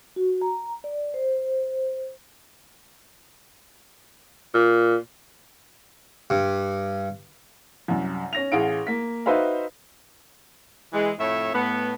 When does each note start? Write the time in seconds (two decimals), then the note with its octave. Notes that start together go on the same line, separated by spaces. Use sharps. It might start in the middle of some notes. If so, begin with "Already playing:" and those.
0.16 F#4
0.42 A#5
0.84 D5
1.14 C5
4.54 A#2
6.30 G2
7.88 C2 F#2
8.33 C#4 A#6 F7
8.52 A1 G#4 F5 F#5 D7
8.87 A#3 B6
9.26 D#4 F#4 B4 C5 E5 F5
10.92 E3 G#3
11.18 F2 A2 A3 C#5 E5
11.53 A2 B3